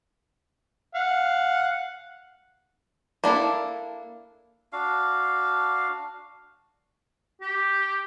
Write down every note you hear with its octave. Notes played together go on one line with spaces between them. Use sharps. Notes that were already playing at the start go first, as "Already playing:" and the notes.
F5 F#5
A#3 D4 E4 A4
D4 F#4 F5
G4